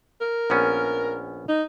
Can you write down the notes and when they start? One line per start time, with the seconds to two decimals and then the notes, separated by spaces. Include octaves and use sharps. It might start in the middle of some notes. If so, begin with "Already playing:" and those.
0.21 A#4
0.50 A#1 B3 C#4
1.49 D#4